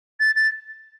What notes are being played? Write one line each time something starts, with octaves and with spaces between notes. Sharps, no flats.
A6
A6